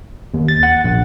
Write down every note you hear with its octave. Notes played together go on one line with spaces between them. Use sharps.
D#2
A6
F#5
A#1